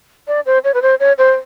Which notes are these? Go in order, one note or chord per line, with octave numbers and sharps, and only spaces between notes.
D5
C5
C#5
B4
C5
C#5
C5